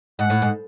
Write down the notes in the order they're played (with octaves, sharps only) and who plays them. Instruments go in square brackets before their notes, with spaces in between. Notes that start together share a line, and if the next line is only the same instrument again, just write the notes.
[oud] G#2 [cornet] F#5
[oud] A2
G#2